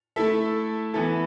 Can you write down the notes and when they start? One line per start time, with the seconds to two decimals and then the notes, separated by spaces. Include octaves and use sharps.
0.16 A3 E4 A4 E5
0.93 E3 B3 E4 A4